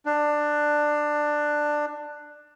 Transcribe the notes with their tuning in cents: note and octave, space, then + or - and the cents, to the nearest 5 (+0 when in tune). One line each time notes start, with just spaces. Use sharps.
D4 +15